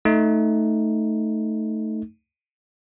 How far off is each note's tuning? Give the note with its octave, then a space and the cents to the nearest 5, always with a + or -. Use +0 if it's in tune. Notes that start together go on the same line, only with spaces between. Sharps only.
A3 +0 D#4 +5